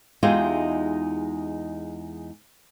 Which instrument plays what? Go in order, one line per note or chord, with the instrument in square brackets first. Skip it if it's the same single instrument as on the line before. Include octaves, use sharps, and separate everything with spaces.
[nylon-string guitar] E2 G#3 D#4 F4 G4 E5